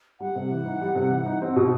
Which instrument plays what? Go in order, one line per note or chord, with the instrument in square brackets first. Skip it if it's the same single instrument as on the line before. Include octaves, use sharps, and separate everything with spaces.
[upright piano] G3 [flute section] F#5
[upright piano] C3
E3
D#4
G3
C3
E3
D#4
C4
B2